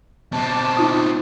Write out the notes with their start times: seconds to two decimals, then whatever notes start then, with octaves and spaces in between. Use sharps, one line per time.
0.33 B2 C4 A5 D6
0.77 D#4 F4 D#6